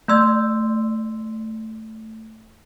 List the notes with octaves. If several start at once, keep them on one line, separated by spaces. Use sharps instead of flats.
A3 D5 C6 E6 G6 G#6